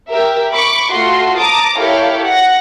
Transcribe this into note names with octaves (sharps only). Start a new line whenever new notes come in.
G4 A#4 E5
B5 C#6 D6
A3 F4 F#4 C6
A5 A#5 D6 D#6
E4 G4 A4 A#4 C#5 F5
F#5 A#6